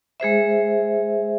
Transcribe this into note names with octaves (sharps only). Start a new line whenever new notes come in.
G#3 G#4 C5 E5